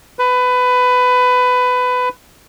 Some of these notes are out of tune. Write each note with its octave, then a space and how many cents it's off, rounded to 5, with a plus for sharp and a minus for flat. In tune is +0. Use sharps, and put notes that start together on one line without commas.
B4 +20